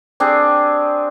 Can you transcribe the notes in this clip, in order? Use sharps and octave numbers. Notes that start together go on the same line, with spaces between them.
C4 D4 G4 G#4